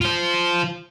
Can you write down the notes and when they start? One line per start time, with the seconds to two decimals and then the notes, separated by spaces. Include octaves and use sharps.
0.01 F4 C5